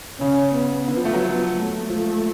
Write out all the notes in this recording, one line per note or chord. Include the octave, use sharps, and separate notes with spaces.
C#3 C#4
B3
D3
F3
A3
F#3
F3
A3
F3